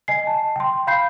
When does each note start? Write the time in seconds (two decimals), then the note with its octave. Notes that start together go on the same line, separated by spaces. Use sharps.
0.08 D#5 G#5 C7
0.27 A5
0.56 G5 C6
0.87 F5 B5 G6 C7